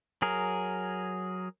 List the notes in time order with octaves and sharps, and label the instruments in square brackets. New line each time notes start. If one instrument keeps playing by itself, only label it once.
[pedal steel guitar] F#3 G#4 A#4